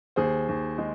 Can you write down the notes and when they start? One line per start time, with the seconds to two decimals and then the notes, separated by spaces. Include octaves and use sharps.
0.16 D#2 G#4 C5
0.48 D#2
0.78 G#3